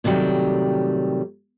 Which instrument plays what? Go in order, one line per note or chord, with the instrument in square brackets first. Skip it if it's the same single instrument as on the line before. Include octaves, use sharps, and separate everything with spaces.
[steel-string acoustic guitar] A2 C3 D#3 F#3 G3